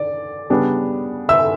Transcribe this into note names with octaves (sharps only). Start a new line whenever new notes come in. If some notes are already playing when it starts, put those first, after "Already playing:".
Already playing: D5
C#3 G3 B3 D4
E5 E6